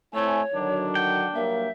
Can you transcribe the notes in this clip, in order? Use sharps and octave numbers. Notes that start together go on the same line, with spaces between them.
A3 C4 E4 C#5 G#5
D3 D#3 F#3 D4
F#5 G5
G2 F#3 A#3 E5